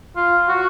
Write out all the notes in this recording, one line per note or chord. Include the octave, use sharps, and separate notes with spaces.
F4
F#4